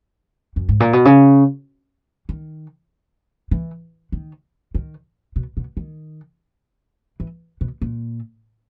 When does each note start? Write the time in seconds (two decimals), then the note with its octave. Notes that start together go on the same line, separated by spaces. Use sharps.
0.56 F#2
0.69 G#2
0.80 A#2
0.93 B2
1.05 C#3
2.29 D#3
3.51 E3
4.12 D#3
4.75 D#3
5.36 B2
5.57 B2
5.77 D#3
7.20 E3
7.61 B2
7.82 A#2